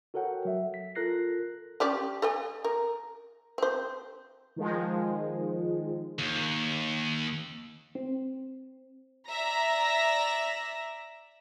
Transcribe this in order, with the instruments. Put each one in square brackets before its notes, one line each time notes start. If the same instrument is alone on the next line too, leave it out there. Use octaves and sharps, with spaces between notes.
[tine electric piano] F#4 A4 A#4 C#5 F#5 G5
F#3 E5
B6
F4 A4 A#4 F#6 A#6 C7
[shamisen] C#4 G4 D5
A4 D#5 G#5
A#4
C4 C5
[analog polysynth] D#3 F3 G#3
[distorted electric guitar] D#2
[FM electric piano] C4
[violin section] D5 E5 A#5 A#6